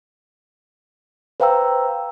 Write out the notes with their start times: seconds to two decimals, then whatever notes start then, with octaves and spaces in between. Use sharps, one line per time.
1.40 B4 C5 F5 G5 A#5 E6